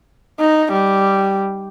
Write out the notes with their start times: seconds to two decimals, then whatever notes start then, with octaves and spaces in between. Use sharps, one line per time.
0.40 D#4
0.72 G3